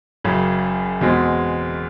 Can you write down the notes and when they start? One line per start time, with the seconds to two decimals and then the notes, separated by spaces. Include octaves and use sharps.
0.24 F#1 F#2 C#3
1.01 E2 B2 G#3 C4